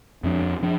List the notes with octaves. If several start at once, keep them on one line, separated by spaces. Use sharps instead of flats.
F2 F3 D4
F3 D4